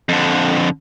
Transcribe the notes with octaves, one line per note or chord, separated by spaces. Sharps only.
F2 D3